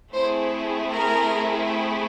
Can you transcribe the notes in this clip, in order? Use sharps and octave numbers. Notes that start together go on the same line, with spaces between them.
A3 C4 E4 G#4 C5
A#4